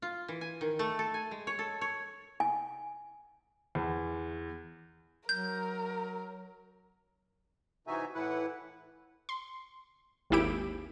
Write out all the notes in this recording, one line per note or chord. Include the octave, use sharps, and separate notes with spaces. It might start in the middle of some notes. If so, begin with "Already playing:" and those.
F4
E3
G#5
D#3
A3
A4
G#5
G#3
C#5
A4
C#5
G#5
E2
F#3 A#4 G6
C3 E3 D#4 F#4 E5 G#5
A2 E3 E4 B4 F#5
C6
G#1 D#2 E4 G4 D7